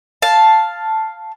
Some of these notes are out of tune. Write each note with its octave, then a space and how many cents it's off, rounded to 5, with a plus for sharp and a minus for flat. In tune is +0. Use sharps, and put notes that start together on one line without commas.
F5 +0 A5 +0